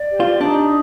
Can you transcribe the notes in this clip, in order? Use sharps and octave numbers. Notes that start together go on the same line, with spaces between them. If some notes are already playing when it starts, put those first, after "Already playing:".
Already playing: D5
G4
F4
D4 D#4